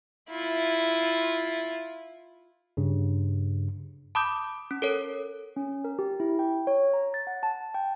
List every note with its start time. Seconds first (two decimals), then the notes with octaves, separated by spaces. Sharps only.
0.31 E4 F4
2.77 G2 C#3
4.15 A5 B5 D6 D#6 G6
4.71 C#4
4.82 A4 A#4 C#5
5.56 C#4
5.84 A#4
5.99 G4
6.20 E4
6.39 G5
6.67 C#5
6.93 A#5
7.14 A6
7.27 F#5
7.43 A5
7.74 G5